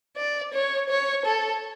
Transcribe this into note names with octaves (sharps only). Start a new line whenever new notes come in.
D5
C#5
C#5
A4